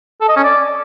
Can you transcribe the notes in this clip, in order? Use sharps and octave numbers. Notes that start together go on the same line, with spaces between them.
A4
D#5
C#4
D5